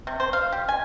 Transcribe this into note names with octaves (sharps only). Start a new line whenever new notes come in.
C3
C5
F5
G4
G#5